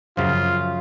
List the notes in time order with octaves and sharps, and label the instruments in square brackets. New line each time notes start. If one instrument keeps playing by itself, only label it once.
[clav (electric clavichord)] F#2 C#3 F3 [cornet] F4